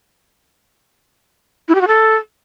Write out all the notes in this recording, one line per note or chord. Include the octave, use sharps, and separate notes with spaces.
E4
G4
F#4
A4